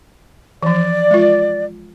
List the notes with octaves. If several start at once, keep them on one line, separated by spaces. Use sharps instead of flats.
E3 F3 D5
G#3 F4